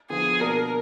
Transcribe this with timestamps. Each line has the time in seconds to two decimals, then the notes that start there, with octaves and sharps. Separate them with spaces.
0.10 D3 F3 B3 F4 G#4
0.40 B2 A#3 D4 A#4